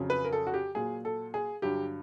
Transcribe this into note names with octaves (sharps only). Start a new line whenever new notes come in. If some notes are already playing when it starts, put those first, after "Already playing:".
Already playing: F2 C#3 F#3
B4
A#4
A4
F#4
G4
A#2 F#3 G#4
A4
G#4
G2 D3 F#3 G4